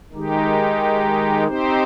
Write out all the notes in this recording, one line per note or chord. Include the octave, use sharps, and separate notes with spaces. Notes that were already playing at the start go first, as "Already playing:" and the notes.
D#3 G#3 D#4 G4
C4 D#4 G4 C5